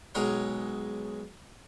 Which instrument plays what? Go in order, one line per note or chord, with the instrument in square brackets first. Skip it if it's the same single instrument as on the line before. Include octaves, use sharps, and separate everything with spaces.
[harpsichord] B1 G#3 G#4 A#4 C#5 F#5